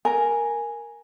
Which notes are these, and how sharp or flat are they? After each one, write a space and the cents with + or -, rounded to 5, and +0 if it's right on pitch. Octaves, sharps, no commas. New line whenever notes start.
A#4 +0 G#5 +0